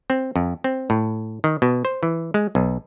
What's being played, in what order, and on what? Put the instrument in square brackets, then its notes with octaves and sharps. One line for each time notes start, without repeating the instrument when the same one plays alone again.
[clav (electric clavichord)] C4
F2
C4
A2
D#3
B2
C5
E3
G#3
B1